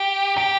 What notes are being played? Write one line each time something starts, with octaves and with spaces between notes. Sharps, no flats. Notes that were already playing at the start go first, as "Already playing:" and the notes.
Already playing: G4
G4